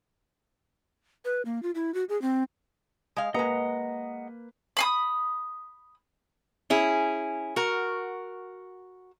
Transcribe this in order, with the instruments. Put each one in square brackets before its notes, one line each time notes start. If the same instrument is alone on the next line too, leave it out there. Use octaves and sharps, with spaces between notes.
[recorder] B4
A#3
F4
E4
F#4
G#4
C4
[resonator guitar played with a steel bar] G#3 F5
[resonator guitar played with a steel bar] G#3 A#5 [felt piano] A#3 B4 [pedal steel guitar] D#5 F#5 D#6
[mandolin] B5 C6 D#6
[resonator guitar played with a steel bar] C#4 E4 G#4
F#4 A#4